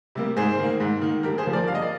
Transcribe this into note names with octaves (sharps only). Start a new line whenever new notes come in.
C3 G3 A#3
G#2 G#4 C5
D#3 A#3
G#2
D#3 A#3
G2 G4 A#4
G#4 C5
F3 A#3
A#4 D5
G2 F5
D#5
D5